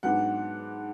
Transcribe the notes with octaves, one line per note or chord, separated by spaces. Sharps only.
G#2 F#3 B3 D4 F#5